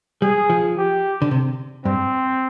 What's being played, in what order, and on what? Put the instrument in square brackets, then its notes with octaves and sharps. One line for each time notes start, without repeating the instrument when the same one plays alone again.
[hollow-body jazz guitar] G3 [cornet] G#4
[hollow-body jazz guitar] F3
[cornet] G4
[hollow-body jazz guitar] D3
C3
[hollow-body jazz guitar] G2 [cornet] C4